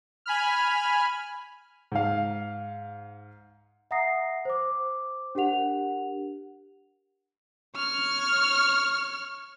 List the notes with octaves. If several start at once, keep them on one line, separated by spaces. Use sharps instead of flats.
G#5 B5 F6
G#2 F5
E5 F#5 A#5 D#6 A#6 C7
C5 D6
D4 G4 A#4 F#5 F7
C#5 F6